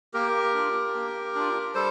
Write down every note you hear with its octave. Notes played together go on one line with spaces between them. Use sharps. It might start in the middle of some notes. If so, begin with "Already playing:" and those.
A#3 G4 A#4
D4 F4
A#3
D4 F4
G3 A4 C5